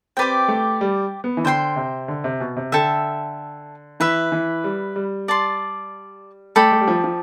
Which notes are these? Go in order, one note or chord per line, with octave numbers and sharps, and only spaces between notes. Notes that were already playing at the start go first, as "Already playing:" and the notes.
C4 G4 B4 D5 G5
A3
G3
B3
E3
D3 C5 G5 C6
C3
D3
C3
B2
C3
D3 A4 E5 G5
E3 B4 E5 B5
E3
G3
G3
D5 A5 C6
A3 A4 D5 G5 B5
A3
G3
F3
F3